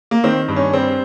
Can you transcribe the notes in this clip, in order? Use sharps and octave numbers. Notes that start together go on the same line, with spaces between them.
A#3
D#3 C4
G2
C#4
G3 C4